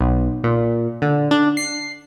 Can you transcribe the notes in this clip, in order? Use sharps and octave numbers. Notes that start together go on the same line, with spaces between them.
B1
A#2
D3
D4
C7